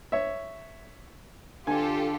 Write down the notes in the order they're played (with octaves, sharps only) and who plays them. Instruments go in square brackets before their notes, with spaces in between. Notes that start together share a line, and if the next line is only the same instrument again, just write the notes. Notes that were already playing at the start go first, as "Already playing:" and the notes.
[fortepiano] C#5 E5
[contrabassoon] D3 [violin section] F4 G4 A4 [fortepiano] G#5